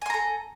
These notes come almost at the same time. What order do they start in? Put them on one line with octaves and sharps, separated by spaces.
G#5 C6 A#5 A4